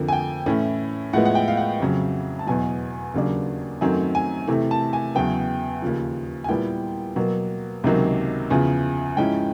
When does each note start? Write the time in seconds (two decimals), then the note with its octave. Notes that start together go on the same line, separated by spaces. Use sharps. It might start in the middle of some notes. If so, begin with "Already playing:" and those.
Already playing: F2 D3 F3 A#3
0.08 G#5
0.13 G5
0.46 A2 E3 A3 C#4 E4
1.13 A2 F3 G#3 B3 F#5
1.25 F#5
1.35 G5
1.48 F5
1.57 F#5
1.80 F2 C#3 F#3
2.39 A5
2.47 E2 B2 F#3 G#5
3.14 D#2 C#3 F#3 A#3 D4
3.81 F#2 D#3 F#3 A3 C4 G#5
4.15 G#5
4.47 C3 E3 A3
4.71 A5
4.93 G#5
5.15 E2 C#3 F#3 B3 G5
5.82 D#2 C#3 F3
6.44 G#5
6.49 A#2 G3 B3 E4 G5
7.16 B2 F#3 A#3
7.84 C#2 C3 D#3 F#3 A#3
8.50 E2 C#3 F3
9.17 G#2 F3 G#3 C#4 E4 G5